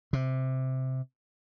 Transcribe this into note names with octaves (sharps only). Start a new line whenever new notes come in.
C3